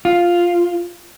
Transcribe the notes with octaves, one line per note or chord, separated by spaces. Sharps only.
F4